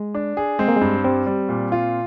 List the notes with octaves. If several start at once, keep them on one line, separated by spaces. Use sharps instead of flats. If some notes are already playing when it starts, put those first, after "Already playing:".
Already playing: G#3
D4
G#4
G#3 C4
A#3
G2 G#3
G3 C4
G3
A#2
F4